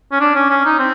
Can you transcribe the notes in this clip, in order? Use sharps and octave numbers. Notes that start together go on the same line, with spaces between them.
C#4
D4
C#4
C#4
D#4
C4